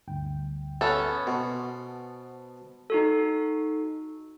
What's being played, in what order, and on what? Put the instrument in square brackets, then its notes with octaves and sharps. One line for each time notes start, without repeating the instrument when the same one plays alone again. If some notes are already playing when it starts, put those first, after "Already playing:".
[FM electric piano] D2 G2 G5
[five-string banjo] B3 C#4 A4
[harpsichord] B2 [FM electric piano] C5 A5
[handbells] D#4 F#4 A4